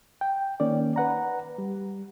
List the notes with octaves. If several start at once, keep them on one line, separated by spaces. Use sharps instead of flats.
G5
D#3 A#3 C#4 D5
B4 F#5 A#5
G3